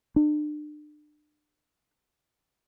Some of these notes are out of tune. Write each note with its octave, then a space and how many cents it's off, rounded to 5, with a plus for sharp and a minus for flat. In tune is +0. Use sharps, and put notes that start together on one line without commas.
D4 +35